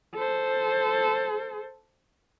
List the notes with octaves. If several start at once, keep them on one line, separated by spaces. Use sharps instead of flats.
A4 C5